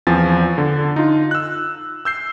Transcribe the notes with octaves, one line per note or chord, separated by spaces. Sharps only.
E2 F3 C4 G#5 A6
D3
D#4 F4
E6 F#6
E6 G6 C7